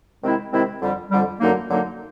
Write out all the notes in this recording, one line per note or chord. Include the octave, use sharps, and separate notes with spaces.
C3 D#3 G#3 C4 E4
C3 D#3 G#3 C4 E4
F2 D3 G3
F2 D3 G3
F#2 D3 F#3 A#3 D#4
F#2 D3 F#3 A#3 D#4